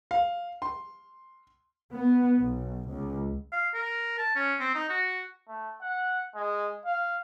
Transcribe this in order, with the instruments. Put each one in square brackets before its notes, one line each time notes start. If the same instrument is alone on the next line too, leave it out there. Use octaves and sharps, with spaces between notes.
[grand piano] F5
C6
[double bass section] B3
B1
C#2
[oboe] F5
A#4
A5
C#4
C4
D#4
F#4
[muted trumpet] A3
F#5
G#3
F5